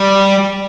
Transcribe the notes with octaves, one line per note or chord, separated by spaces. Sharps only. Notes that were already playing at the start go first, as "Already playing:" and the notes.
Already playing: G3